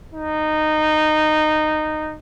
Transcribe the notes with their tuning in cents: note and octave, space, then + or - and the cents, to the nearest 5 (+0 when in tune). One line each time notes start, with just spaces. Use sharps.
D#4 -15